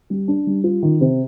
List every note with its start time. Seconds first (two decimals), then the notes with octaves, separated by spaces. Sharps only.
0.10 G3
0.28 D4
0.46 G3
0.64 F4
0.82 D#3
1.01 C3